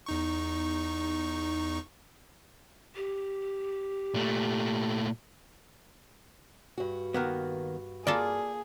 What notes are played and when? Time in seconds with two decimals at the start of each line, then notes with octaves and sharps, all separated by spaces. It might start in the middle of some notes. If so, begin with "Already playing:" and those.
0.06 E2 D#4 C#6
2.96 G4
4.14 A#2 A3
6.78 G2 F#4
7.14 D#3 A#3 B3
8.07 A#3 F4 G#4 A4 D5